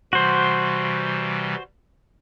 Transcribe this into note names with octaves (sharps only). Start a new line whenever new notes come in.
C3 E3 G3 F#4 C5